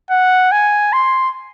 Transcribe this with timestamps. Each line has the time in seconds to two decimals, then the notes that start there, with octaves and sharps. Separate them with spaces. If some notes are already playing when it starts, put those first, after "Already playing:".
0.10 F#5
0.52 G#5
0.93 C6